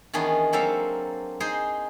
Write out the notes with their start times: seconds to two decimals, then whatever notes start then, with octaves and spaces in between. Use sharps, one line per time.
0.13 D#3 E3 B3 C#4 D4 G#4
0.53 F#3 A#3 C4 A4 E5 F5
1.40 D#4 G#4 C5